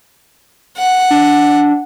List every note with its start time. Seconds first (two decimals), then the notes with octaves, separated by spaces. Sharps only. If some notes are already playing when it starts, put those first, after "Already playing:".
0.77 F#5
1.10 D4